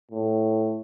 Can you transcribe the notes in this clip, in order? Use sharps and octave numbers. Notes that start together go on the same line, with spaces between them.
A2